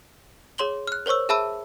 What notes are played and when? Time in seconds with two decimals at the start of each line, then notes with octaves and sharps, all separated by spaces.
0.58 G#4 C#5 C6 F#7 G7
0.87 F6 F#6
1.06 A#4 C5 C#5 C#6 E6
1.29 G#4 E5 A5 B5 E6 D#7